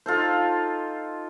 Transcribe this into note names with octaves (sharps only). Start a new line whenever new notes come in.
D#4 F4 A4 C5